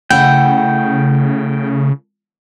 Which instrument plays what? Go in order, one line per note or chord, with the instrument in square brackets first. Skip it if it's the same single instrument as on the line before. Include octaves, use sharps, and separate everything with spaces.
[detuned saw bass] C#3 [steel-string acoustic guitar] A3 E4 F#5 [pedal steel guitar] G5